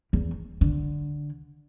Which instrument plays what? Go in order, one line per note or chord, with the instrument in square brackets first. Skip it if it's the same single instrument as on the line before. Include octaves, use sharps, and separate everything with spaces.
[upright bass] E2
D3